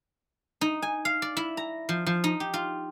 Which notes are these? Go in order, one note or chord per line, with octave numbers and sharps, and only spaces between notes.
D#4
G#5
F5
D5
E4
A#5
F3
F3
D#4
G4
F4